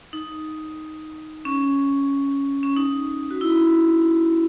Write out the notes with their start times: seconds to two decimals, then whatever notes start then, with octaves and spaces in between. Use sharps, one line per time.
0.13 D#4
1.45 C#4
2.63 C#4
2.77 D#4
3.31 F#4
3.41 E4